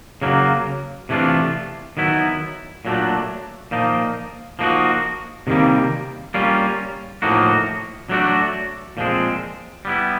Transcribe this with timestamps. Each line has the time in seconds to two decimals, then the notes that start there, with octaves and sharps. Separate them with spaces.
0.22 C#3 F#3 A#3
1.09 C3 E3 A3 D4 F4
1.97 D#3 F#3 B3 E4
2.85 A#2 F#3 A3 D4
3.71 A#2 F3 A#3 D#4
4.59 F3 A#3 D#4 F#4
5.47 C3 D#3 G3 A#3
6.34 G3 A#3 C#4 F4
7.22 A2 F3 A#3 D#4 F#4
8.09 F#3 A3 D4 F#4
8.97 A#2 F3 G#3 C4
9.85 G3 B3 E4